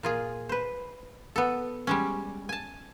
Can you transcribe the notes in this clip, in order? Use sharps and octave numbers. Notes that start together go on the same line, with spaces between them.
A#2 F4 G#4
B4 C5
B3 A4
G3 G#3 C#4
G#5 A5